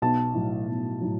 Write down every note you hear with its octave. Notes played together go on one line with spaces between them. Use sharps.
B1 A5
A2 F#3
B1
A2 F#3